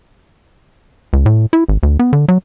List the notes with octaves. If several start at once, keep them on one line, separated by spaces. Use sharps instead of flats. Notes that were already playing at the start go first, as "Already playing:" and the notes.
C#2
A2
E4
G#1
D2
B3
D3
F#3